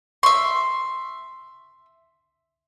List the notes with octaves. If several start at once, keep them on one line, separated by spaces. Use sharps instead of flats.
E5 C6 C#6